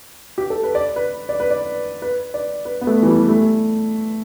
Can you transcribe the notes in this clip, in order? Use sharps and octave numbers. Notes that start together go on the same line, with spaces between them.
G4
A4
B4
D5
B4
D5
B4
D5
B4
D5
B4
B3
A3
E3
G3
A3